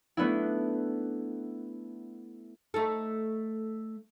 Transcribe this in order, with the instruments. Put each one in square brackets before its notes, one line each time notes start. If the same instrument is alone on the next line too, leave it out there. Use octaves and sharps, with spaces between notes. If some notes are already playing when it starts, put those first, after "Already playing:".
[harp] A3 B3 D4 E4
[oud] A3 D#4 A4